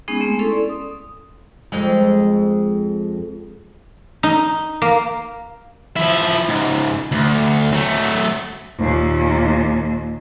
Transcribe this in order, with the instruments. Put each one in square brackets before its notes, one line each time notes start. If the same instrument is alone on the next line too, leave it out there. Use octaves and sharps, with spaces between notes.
[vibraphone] G#3 B3 C#4 D#4 G#4
G#3 A3 C4
C#4 E4 A4 C6
D5
D#6
[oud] F2 G#3
[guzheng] D#4
A#3
[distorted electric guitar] F3 E4
C#2 G#2
D2
F#3 A3
[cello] D#2 A#2